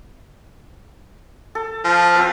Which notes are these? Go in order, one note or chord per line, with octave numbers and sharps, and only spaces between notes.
A4
F3
C4 F4 B4